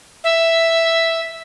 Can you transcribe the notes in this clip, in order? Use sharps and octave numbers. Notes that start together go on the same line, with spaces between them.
E5